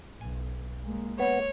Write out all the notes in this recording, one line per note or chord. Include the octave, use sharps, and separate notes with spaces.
B1 G#5
G#3 A#3
B3 C#5